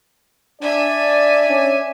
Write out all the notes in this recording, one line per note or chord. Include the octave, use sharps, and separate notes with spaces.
D4 D5 E5 G#5
C#4